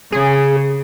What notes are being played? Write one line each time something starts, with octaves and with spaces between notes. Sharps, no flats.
C#3 G#4